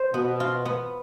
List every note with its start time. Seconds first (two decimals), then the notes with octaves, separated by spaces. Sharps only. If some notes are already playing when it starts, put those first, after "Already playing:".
Already playing: C5
0.14 B2 B3
0.40 F4
0.65 B3